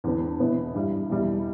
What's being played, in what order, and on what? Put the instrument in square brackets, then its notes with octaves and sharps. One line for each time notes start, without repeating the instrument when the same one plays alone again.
[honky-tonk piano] E2 D3 B3 D4
E2 B2 B3 E4
G2 G3 E4
E2 B2 G3 E4